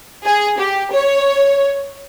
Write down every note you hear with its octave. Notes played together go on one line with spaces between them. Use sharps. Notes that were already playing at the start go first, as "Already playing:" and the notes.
G#4
G4
C#5